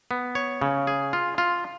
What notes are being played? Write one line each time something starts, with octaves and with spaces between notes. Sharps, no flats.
B3
C#5
C#3
G#4
F4
F4